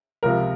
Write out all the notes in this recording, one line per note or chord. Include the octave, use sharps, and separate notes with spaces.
C#2 C3 F3 A#4